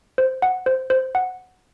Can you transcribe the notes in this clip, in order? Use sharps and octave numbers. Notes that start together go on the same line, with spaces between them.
C5
F#5
C5
C5
F#5